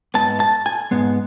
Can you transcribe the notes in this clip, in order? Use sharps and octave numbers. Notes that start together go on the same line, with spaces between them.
G#2 G#3 B3 A5
A5
G#5
G#2 G#3 B3